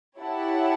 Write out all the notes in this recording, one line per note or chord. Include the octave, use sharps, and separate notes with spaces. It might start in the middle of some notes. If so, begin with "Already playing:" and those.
E4 G4 C#5 F#5 A5